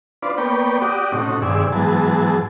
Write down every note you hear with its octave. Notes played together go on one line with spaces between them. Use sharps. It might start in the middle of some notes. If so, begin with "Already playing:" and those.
D4 F4 B4 C5 D5
A#3 B3 B4 C#5 D5 G5
F#4 G4 D5 D6 D#6
A2 C3 C#4 D#4 F#4
G2 C3 D#3 G#4 D5 E6
G#2 E3 F#3 B3 G#4 A5